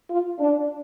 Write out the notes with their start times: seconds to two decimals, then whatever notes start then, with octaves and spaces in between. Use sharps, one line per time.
0.09 F4
0.40 D4